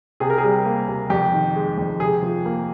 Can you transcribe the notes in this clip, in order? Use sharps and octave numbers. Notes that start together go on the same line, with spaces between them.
C3 G#4
A#4
G#4
G3
A#3
C3
F2 G4
D#3
G#3
F2
C3 G#4
F3
A#3